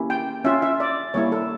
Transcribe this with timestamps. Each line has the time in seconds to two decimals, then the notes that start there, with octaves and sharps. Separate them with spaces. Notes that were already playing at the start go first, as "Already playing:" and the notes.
Already playing: A#3 C#4 E4 G4
0.10 G5
0.44 C#4 F4 E5
0.62 E5
0.80 D5
1.14 G3 A#3 E4 C#5
1.32 A4